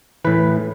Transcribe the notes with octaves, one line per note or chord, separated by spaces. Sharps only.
A2 E3 B4